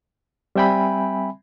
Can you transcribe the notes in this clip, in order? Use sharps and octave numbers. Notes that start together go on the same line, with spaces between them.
G3 C4 E5 G5 G#5 B5